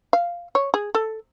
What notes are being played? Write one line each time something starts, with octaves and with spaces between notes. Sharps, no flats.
F5
C#5
G#4
A4